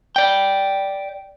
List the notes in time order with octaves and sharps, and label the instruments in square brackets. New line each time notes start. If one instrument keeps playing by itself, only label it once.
[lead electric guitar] D5 G5